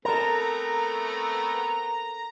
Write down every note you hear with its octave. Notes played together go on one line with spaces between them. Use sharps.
A3 B3 C4 A4 A#4 A#5